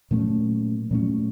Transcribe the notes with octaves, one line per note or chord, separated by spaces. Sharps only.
A#2 F#3 A3 C#4
A#2 F#3 A3 C#4